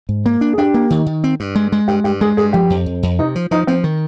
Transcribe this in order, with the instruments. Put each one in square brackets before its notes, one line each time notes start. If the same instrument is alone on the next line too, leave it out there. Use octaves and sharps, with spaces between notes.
[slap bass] G#2
A#3
D4
[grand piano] G#4
[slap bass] D4 [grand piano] G4
[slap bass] A#3
D#3
D#3
C4
G2
G#3
G#3
[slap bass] G2 [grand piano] G4
[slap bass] G2 [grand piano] G4
[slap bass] G#3 [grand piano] G#4
[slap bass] G2 [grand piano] G#4
[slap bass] F3 [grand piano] G4
[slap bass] F2
F2
F2
[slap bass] C3 [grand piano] D#4
[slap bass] F3
[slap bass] F3 [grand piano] D#4
[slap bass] F3 [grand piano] C4
[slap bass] D#3